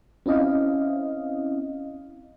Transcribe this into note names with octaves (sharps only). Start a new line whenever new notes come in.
C4 C#4 E4 D#5 F5